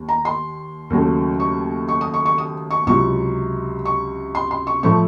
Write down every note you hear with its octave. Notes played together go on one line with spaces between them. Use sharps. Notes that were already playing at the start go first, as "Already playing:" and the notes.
Already playing: D#2
A#5
C6
D#2 C#3 F#3 A3
C#6
C#6
D#6
C#6
C#6
D#6
C#6
C#2 C3 F#3 C#6
C#6
C6
C6
C#6
A2 F3 A3 C#6